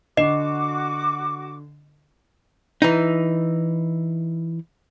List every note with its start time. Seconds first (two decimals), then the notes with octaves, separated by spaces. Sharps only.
0.17 D3 F#4 D#5 D6 C7 E7
2.82 E3 D#4